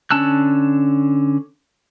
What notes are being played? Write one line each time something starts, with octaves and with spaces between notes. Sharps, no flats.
D3 C#4 A5 E6 F#6